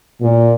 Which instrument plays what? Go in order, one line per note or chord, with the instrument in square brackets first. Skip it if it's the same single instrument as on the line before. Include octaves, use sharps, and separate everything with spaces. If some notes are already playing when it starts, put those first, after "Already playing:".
[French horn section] A#2